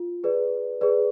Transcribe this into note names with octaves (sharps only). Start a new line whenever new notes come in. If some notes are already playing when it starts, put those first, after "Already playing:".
Already playing: F4
G#4 B4 D5
G#4 B4 D5